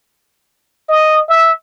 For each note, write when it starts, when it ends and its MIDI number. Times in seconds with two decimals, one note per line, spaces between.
0.89 1.21 75
1.29 1.51 76